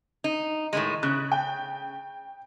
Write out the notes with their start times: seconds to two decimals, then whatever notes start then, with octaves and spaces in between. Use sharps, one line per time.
0.24 D#4
0.73 A2 D#3 G#3
1.03 C#3 F#6
1.32 G5